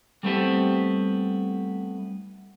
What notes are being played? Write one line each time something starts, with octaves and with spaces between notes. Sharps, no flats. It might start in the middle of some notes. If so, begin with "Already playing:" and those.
G3 A3 B3 C4 E4 G4